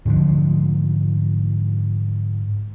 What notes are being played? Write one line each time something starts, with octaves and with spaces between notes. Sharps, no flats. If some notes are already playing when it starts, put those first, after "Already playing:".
G#2 D3 F3 G#3